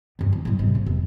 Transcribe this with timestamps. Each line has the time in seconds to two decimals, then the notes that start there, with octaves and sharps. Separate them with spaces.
0.19 D2 G2
0.33 E3
0.45 A2 G3
0.59 G#2 C3
0.75 A#3
0.86 F1